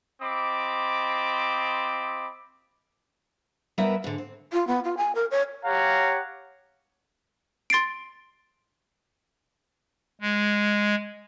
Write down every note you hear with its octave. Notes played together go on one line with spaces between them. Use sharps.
C4 F4 D#5 B5 D6
G3 B3 E4 A#4 B4 E5
G#2 D3
C4
F4
B3
F4
G#5
A#4
C#5
G4 C#5 F5 F#5 A#5
C6 A6 C7 D7
G#3